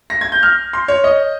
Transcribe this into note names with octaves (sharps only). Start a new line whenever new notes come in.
A#6
G#6
G6
F6
C6
C#5
D#5